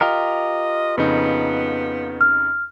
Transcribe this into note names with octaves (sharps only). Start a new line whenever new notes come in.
F4 G4 A#4 D#5
F2 C#3 B3 D#4
F6